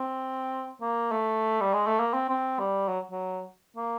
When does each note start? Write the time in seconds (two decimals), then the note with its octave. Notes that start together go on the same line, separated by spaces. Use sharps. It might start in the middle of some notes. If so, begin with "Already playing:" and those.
Already playing: C4
0.81 A#3
1.11 A3
1.61 G3
1.74 G#3
1.87 A3
2.00 A#3
2.14 C4
2.30 C4
2.59 G3
2.88 F#3
3.11 F#3
3.76 A#3